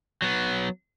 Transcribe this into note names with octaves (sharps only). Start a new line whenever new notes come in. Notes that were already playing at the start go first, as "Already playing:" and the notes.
F#3 B3